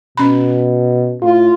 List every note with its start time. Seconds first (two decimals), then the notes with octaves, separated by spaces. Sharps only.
0.17 B2 C#4 B5
1.22 A2 F4